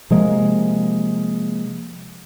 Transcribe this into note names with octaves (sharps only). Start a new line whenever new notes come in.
C3 F3 G#3 A#3